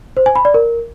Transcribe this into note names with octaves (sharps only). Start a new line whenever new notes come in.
C5
G#5
B5
D5
A#4